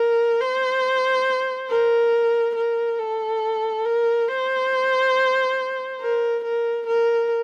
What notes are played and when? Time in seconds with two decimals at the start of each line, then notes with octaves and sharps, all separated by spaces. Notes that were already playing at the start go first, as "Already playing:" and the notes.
Already playing: A#4
0.40 C5
1.69 A#4
2.55 A#4
2.99 A4
3.85 A#4
4.28 C5
6.01 A#4
6.44 A#4
6.87 A#4